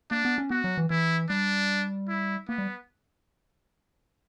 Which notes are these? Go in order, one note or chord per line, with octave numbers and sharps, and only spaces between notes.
A#3 D4
B3
C#4
B3 F#4
F#3
E3
E3 E4
G3 D4
E4
A#3 B3
G3